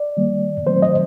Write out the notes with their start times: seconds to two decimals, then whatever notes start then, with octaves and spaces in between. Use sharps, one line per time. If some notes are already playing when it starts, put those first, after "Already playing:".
Already playing: D5
0.17 D#3 G3 A#3
0.66 D#3 F#3 A3 C4 C5
0.82 D#5